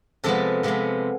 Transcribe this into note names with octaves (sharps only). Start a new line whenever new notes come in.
C3 F3 G#3 B3 A4
C3 F3 G#3 B3